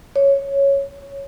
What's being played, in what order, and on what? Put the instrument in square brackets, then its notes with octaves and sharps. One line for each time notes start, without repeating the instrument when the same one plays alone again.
[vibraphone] C#5